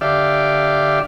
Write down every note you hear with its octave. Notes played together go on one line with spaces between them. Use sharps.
D3 G4 D5 E5 F5